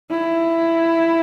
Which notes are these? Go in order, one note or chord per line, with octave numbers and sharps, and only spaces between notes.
E4